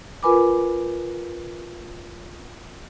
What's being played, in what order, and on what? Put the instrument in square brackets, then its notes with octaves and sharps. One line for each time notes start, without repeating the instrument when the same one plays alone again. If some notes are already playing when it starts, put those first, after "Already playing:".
[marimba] F4 A#4 B4 G#5 B5 D6